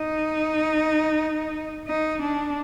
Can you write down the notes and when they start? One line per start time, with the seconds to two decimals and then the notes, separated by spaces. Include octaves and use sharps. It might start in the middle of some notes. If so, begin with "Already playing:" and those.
Already playing: D#4
1.87 D#4
2.22 D4